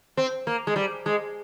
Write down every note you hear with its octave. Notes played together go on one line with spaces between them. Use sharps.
C4
A#3
G#3
G3
G#3